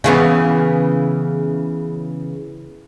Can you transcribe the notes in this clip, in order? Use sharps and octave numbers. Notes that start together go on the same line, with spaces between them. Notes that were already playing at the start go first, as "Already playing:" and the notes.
C#3 E3 B3